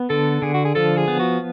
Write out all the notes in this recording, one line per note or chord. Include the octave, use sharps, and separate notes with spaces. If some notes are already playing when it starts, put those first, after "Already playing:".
Already playing: B3
D3 A4
D3 G#4
F#4
G#4
F3 A4
G#4
B3
F#4